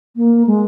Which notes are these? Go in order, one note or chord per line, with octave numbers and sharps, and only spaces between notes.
A#3
G#3